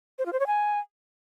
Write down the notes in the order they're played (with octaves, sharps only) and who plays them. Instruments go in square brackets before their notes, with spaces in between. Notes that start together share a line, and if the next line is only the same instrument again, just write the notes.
[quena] C5
F4
C5
C#5
G#5